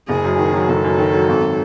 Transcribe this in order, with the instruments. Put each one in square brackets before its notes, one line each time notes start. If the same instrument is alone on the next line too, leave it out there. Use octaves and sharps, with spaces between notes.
[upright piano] F#1 [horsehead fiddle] G#4
[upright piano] F#2
D#3
F#3
[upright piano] F#1 [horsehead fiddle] A4
[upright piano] F#2
D#3
F#3
G#1